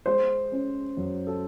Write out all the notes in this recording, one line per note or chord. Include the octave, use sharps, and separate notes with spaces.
G#3 C5
C#4
F#2
A4